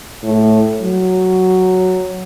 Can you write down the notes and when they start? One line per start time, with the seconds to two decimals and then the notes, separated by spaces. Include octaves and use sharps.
0.23 A2
0.82 F#3